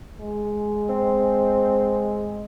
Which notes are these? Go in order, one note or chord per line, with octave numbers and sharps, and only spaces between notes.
G#3
C4